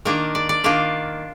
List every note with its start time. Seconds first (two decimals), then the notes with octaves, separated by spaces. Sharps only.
0.05 D#3 A#3 D4 F4 A#4
0.35 D5
0.49 D5
0.64 D#3 A#3 D4 F4 F5